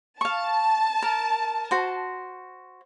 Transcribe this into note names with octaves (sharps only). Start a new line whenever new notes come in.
F5 A5 C#6
A#4
F#4 C5